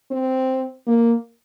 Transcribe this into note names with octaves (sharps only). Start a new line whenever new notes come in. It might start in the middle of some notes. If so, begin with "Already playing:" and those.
C4
A#3